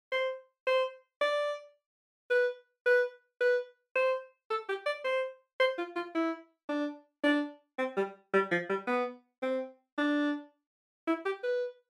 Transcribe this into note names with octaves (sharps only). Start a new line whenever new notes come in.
C5
C5
D5
B4
B4
B4
C5
A4
G4
D5
C5
C5
F4
F4
E4
D4
D4
C4
G3
G3
F3
G3
B3
C4
D4
E4
G4
B4